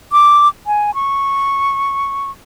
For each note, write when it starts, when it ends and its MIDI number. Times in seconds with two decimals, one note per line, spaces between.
0.12 0.48 86
0.67 0.94 80
0.95 2.31 85